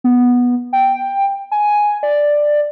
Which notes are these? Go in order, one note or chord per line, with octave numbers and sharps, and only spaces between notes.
B3
G5
G#5
D5